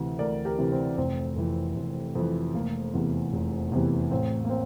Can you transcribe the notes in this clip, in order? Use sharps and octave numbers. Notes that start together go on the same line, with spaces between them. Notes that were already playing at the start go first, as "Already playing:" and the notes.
Already playing: D2 C3 E3
D2 A#4 D5
G4 A#4
C3 E3
C4
F1 C4
F2 E3
F1
F2 E3
F1 A#3
E2 C3 E3
F1
E2 C3 E3
A1 C4
A#3
C4